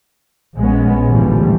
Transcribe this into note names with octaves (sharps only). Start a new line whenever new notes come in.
A#1 G#3 B3 C#4
A1 D2 G2 E3 F3 G3